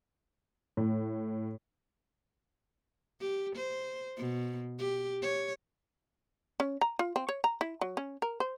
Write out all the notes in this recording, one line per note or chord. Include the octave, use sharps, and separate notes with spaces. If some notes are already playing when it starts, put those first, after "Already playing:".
A2
G4
C5
B2
G4
C#5
C#4
A#5
F4
C4
C#5
A#5
E4
F#3
C#4
A#4
C5